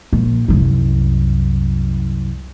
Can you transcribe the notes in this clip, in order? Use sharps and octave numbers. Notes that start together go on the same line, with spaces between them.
A#1
C2 F#2